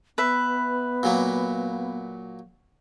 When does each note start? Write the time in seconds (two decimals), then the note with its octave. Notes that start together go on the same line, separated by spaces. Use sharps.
0.18 B3 B4 E5
1.03 A#2 F#3 A#3